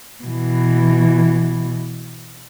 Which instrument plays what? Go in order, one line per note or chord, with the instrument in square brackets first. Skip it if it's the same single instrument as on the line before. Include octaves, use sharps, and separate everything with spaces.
[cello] B2 E3